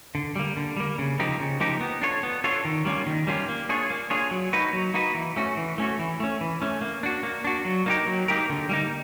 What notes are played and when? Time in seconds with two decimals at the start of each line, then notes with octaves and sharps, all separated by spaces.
0.15 D3
0.36 G3 A#3
0.57 D3
0.77 G3 A#3
0.98 C#3
1.19 F3 A#3 D#4 G4
1.40 C#3
1.60 F3 A#3 D#4 G4
1.81 B3
2.02 D4 F4 A4 C#5
2.23 B3
2.44 D4 F4 A4 C#5
2.65 D#3
2.85 G3 A#3 C#4 F4
3.07 D#3
3.27 G3 A#3 C#4 F4
3.49 A#3
3.69 D4 F4 G#4 C#5
3.90 A#3
4.10 D4 F4 G#4 C#5
4.31 F#3
4.53 A#3 D#4 F#4 B4
4.73 F#3
4.94 A#3 D#4 F#4 B4
5.15 E3
5.36 A3 C#4 F#4
5.57 E3
5.78 A3 C#4 F#4
5.99 E3
6.20 A3 C#4
6.41 E3
6.62 A3 C#4
6.82 A#3
7.03 D4 F#4
7.23 A#3
7.44 D4 F#4
7.65 F#3
7.86 A#3 D#4 G4 A#4
8.07 F#3
8.28 A#3 D#4 G4 A#4
8.50 D3
8.69 G3 A#3 D#4